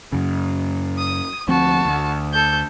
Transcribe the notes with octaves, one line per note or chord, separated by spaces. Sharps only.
F#2 C#3
D#6
D2 F3 C4 F#4 A5
D2
A4 G6